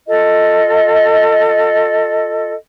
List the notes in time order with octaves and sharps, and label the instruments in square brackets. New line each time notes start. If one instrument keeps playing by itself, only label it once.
[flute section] F4 A4 D#5